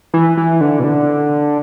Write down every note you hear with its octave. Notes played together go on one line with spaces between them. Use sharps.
E3
E3
D3
B2
D3